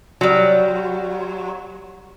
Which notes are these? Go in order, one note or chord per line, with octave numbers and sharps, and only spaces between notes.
F#3 G3